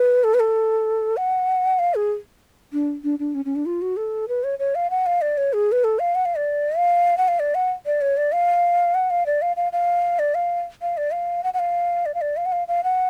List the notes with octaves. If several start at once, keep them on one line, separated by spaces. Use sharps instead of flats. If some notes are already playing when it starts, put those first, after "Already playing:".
Already playing: B4
A4
B4
A4
F#5
F5
G#4
D4
D4
D4
C#4
C#4
D4
F4
F#4
A4
B4
C#5
C#5
F5
F#5
F5
D5
C#5
G#4
B4
A4
F5
F#5
F5
D5
F5
F#5
F5
D5
F#5
D5
C#5
D5
F5
F#5
F5
D5
F5
F5
F5
D5
F5
F5
D5
F5
F#5
F#5
F5
D5
F5
D5
F5
F#5
F5
F5
F#5